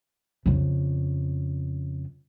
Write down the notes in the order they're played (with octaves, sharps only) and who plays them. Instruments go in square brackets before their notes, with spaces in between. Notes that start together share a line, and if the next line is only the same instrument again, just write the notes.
[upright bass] F2 C#3